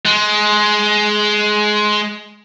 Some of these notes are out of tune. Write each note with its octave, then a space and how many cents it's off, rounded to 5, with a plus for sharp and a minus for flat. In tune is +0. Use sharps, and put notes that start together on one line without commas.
G#3 +15